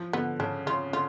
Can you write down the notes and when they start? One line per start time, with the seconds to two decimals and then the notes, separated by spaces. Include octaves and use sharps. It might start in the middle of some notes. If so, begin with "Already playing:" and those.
Already playing: F3
0.13 D3 B3
0.40 C#3 D4
0.67 C#3 F4
0.93 D3 F4